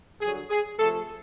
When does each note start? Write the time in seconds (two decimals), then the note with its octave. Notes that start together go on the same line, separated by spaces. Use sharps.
0.20 G2 D3 F#3 G#4
0.50 G#4
0.78 C3 F3 A3 A4